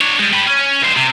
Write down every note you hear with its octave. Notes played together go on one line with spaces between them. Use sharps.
D4 C#5
G3 G#3
G4 B4
C#4
G2 C5
C3